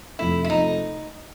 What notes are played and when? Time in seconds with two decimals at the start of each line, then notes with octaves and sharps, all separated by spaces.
0.19 F2 C3 F3 A3 E4
0.44 E4
0.50 C3 F3 A3 D#4